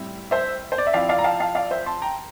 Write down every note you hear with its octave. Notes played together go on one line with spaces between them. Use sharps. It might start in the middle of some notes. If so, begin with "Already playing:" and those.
Already playing: A2 G3 C4 E4
C5 E5
C5
D5
E5
F3 C4 E4 D5 F5
D5 F5
A#5
F5 A5
F5 A5
D5 F5
C5 E5
A5 C6
G5 A#5